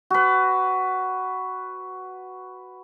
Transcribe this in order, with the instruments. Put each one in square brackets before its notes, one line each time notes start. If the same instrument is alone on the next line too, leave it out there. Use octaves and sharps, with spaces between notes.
[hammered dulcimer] F#4 B4